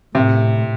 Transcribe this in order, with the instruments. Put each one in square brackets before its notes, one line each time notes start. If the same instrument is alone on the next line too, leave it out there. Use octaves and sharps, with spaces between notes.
[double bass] A2 [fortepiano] C3